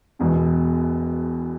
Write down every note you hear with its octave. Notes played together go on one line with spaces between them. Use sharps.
E1 E2 B2